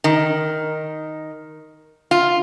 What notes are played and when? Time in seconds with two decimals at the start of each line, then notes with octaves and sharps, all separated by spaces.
0.04 D#3
2.11 F4